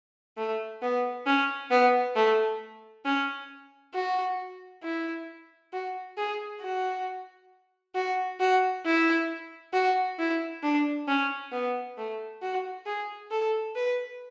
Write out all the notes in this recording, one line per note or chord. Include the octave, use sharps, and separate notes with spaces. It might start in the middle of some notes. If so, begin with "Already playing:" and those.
A3
B3
C#4
B3
A3
C#4
F#4
E4
F#4
G#4
F#4
F#4
F#4
E4
F#4
E4
D4
C#4
B3
A3
F#4
G#4
A4
B4